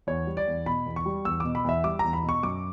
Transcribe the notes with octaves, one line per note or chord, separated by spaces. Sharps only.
E2 C#5
G3
D5
E2
B2 B5
E2
C#6
G3
E2 E6
B2 D6
B5
E2 E5
G3 D6
E2 A#5
B5
B2
C#6
F#2 D6